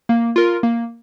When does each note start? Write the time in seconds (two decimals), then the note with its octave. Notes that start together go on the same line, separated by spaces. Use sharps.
0.09 A#3
0.36 F4 A#4
0.63 A#3